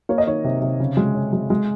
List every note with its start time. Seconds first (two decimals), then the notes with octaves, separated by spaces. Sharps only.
0.09 A#3 C#5
0.18 D#5
0.27 D#3 C#5
0.44 C3
0.62 C3
0.80 C#3
0.97 G#3
1.15 C#4
1.33 G#3
1.50 G#3